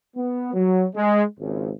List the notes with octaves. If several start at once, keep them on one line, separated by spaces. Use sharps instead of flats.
B3
F#3
G#3
G#1 C#2 G#2